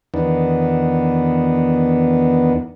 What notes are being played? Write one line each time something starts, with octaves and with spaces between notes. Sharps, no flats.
E2 D#3 B3 D4